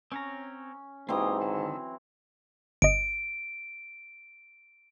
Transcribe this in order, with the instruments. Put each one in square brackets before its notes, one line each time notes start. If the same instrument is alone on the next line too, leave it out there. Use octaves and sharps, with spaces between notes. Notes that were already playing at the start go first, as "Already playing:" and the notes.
[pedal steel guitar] C4 C#5 A#5 [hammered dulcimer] C#4
[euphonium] G#2 [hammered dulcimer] E3 F#3 C4 [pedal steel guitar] A#3 G4 D#6
[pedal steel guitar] D3 D#3 A4
[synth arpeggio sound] G1 D#5 [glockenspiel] D7